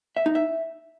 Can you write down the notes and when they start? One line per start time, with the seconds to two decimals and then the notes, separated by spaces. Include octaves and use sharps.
0.17 E5
0.26 D#4
0.35 E5